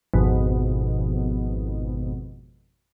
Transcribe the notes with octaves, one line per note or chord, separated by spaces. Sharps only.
G#1 F2 B2